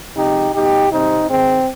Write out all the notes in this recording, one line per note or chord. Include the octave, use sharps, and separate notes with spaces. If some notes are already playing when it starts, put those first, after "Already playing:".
C3 F3 G#3 D#4 G4
B2 G3 D#4 G4
C3 G3 C4 D#4
G#2 D#3 G#3 C4